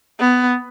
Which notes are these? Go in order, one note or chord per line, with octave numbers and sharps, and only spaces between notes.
B3